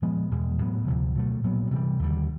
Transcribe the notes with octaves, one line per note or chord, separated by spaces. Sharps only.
A#2 F3 G#3 B3
E2 B2 G#3
A2 F#3 B3
D2 C3 F3
B2 F#3 A3
A#2 F#3 B3
C3 E3 G3
D#2 D3 G3